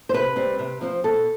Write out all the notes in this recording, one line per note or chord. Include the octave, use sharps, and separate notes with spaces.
C5
C3 B4
G3 C4
C3
F3 C4
B2 A4